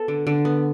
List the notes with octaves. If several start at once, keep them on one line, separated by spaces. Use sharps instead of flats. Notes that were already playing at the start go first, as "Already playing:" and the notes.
Already playing: B3 A4
D3
D3
B3